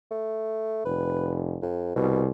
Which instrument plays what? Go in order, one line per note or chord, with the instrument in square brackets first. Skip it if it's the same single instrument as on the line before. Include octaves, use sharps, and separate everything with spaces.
[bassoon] A3
[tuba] F1 [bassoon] B4
[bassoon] F2
[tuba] C2 [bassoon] B2